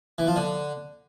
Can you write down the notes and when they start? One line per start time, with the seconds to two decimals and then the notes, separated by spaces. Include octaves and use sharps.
0.18 E3
0.27 F3
0.36 D3